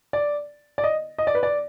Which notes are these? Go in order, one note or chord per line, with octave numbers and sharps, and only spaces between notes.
D5
D5
D#5
D#5
D5
B4
D5